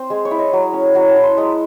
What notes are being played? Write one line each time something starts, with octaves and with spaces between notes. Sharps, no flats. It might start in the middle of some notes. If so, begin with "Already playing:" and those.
Already playing: C4 C5
G#3 G#4
C#5
E4
D#5
F#3
C#4
F#3 F#5
A5
E4
C6
G#3 D#6